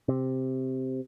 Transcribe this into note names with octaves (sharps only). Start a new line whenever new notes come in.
C3